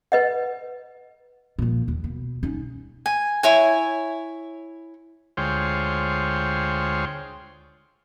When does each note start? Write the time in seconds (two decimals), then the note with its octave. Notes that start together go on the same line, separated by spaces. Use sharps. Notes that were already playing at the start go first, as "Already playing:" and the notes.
0.12 B4 D#5 F#5
1.59 A#2 F3
1.88 D#2
2.04 B2
2.43 C#4 D#4
3.06 G#5
3.43 E4 C#5 G#5
5.37 D2 G#3 F4 C5 C#5 G5